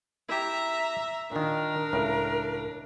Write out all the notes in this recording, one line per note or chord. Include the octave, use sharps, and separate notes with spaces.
E4 G4 E5 A#5
A#2 D#3 D4 A#4
C#2 A2